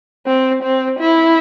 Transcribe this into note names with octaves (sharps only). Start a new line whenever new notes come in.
C4
C4
E4